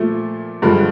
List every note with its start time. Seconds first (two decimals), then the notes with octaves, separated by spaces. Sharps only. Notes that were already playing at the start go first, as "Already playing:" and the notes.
Already playing: A#2 F3 A3
0.62 G2 D3 F3 G#3